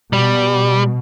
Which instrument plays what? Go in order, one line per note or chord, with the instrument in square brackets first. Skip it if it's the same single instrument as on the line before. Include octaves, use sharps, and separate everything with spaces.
[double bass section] B2 [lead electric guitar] G3